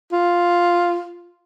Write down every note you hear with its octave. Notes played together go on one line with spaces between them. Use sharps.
F4